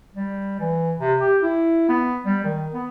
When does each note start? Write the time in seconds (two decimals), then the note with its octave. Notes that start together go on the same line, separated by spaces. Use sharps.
0.14 G3
0.59 E3
1.00 C3
1.21 G4
1.42 E4
1.89 B3
2.26 G3
2.44 D#3
2.73 B3